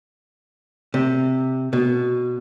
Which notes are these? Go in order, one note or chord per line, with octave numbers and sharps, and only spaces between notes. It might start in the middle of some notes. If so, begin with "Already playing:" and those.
C3
B2